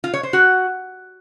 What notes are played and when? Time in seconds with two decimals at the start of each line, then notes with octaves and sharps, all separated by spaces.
0.04 F4
0.14 C#5
0.23 C5
0.33 F#4